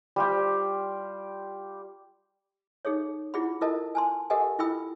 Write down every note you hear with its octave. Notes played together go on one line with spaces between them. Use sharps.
G3 F4 G4
D#4 G#4 A4 C#5
E4 F4 G#4 F#5 B5
E4 F4 A4 A#4 D#5 A5
G#5 A5 C6
G4 A4 A#4 D#5 F#5 G#5
E4 F4 A4 G5 B5 E6